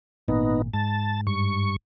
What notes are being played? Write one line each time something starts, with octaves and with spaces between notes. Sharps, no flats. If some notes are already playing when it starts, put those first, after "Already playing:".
G#1 A#2 B3 D#4
G#2 A5
G2 C#6